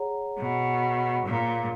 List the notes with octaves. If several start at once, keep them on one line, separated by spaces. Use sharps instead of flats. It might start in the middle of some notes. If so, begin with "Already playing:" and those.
Already playing: G#4 C#5 F#5 A#5
B2
A#2